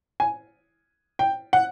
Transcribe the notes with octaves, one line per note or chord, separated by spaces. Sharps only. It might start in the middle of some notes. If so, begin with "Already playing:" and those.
G#5
G5
F#5